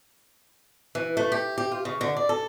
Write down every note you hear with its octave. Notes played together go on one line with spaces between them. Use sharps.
E3
A3
G4
G4
F4
C#3
D3
D5
A4